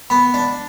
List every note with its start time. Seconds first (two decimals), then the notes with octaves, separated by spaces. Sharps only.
0.10 B3 B5
0.34 D4